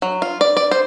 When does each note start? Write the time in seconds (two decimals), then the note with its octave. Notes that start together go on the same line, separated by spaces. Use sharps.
0.02 F#3
0.22 F4
0.41 D5
0.57 D5
0.71 C5